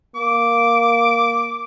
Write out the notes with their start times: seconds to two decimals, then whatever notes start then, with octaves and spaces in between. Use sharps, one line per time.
0.15 A#3 D6